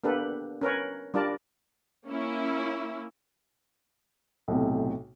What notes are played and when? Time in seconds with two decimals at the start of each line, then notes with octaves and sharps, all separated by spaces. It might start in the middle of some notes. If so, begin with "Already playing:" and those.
0.04 A#3 B3 D4 G4 A4 B4
0.61 C#4 A#4 B4 C#5
1.14 G3 D4 F4 A#4 D5 A5
2.06 A#3 C#4 E4
4.48 B1 A2 C3